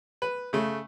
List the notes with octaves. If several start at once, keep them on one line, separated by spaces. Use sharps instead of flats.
B4
C#3 A3